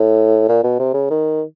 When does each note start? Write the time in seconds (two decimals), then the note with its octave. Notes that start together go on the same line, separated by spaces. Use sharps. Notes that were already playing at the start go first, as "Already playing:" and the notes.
Already playing: A2
0.49 A#2
0.64 B2
0.80 C3
0.94 C#3
1.10 D#3